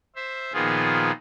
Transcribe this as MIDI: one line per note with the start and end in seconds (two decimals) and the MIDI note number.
0.16 0.53 72
0.16 0.53 76
0.53 1.11 46
0.53 1.11 51
0.53 1.11 53
0.53 1.11 59
0.53 1.11 65
0.53 1.11 68